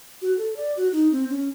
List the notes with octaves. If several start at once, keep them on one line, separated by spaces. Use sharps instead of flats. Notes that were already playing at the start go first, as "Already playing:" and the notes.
F#4
A4
D5
F#4
D#4
C4
C#4